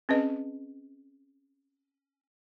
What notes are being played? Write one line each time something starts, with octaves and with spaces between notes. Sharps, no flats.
C4 C#4 G#4 B4 D#5